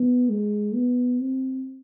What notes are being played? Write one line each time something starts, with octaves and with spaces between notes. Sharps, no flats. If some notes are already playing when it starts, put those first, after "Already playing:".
Already playing: B3
G#3
B3
C4